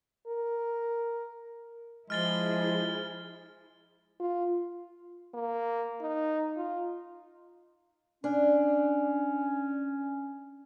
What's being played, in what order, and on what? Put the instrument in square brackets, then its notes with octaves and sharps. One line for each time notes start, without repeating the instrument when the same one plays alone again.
[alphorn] A#4
[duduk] F3 [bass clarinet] G#3 [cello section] E4 G#4 [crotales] F6 A6 G7
[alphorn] F4
[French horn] A#3
D#4
F4
[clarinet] C#4 [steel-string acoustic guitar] D4